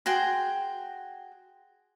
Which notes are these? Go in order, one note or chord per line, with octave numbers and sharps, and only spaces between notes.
F#4 G#4 G5 C6